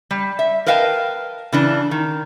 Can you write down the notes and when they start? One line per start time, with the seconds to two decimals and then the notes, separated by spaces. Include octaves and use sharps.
0.11 G3
0.39 E5
0.66 A#4 B4 D#5 F5 G5 A5
1.52 C#3 E3 D4
1.91 D#3